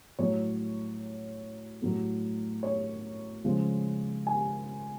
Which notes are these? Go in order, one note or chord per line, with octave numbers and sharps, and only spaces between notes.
A2 F#3 A3 C#5
A2 F#3 A3
C#5
C#3 F3 G#3
G#5